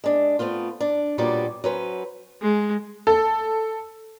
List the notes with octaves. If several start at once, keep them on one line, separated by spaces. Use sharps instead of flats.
G#3 D4
A3 B3 C4 F4
D4
A#2 G3 B3 F#4 C#5 D5
F#3 C#4 B4 C5
G#3
A4